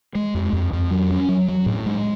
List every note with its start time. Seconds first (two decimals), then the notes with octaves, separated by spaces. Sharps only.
0.15 G#3
0.34 F2
0.53 F2
0.73 F2
0.91 F#3
1.11 C#4
1.29 F#3
1.48 F#3
1.66 A2
1.86 G#3